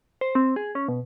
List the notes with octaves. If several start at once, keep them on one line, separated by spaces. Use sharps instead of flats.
C5
C4
G#4
C#4
B2